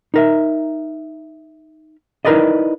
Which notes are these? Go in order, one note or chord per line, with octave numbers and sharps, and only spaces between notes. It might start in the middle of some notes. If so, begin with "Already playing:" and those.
D#4 A#4 E5
D#4 E4 A#4 B4 D5 D#5